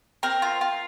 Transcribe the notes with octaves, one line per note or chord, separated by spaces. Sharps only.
C4 A#4
F4
F4